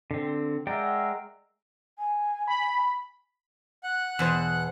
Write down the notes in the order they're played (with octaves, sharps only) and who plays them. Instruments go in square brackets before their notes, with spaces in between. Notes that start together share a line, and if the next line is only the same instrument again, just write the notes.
[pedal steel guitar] D3 C4
[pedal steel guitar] G#3 D5 G5 [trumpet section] A#4 E5 F#5
[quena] G#5
[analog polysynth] B5
[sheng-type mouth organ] F#5 F#6
[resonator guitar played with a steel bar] E2 B2 C5